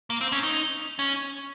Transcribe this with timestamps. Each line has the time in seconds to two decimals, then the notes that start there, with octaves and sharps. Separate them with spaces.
0.10 A#3
0.21 C4
0.32 C#4
0.43 D#4
0.99 C#4